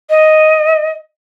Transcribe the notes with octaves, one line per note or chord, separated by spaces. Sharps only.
D#5